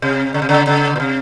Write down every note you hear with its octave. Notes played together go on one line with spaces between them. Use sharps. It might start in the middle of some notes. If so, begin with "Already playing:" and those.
C3
C#3
C3
C#3
C#3
A#2
C3